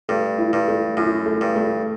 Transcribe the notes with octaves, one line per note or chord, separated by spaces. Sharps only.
G2 A3
E4
G2
A3
F#2 E4
A3
G2
A3